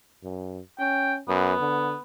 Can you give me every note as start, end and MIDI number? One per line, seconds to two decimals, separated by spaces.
0.23 0.60 42
0.79 1.20 61
0.79 1.13 79
1.28 1.54 42
1.28 2.01 59
1.60 1.95 50